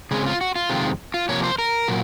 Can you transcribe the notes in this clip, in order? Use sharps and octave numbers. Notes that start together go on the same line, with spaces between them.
C#3 G#3 C4 G#4
F4
F#4
F4
F2 C3 D#3 G#3 C4
F4
C3 F3 A#3 C#5
C5
A#4
A#2 F#3